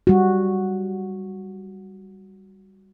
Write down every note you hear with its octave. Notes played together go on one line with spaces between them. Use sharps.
G3 F#4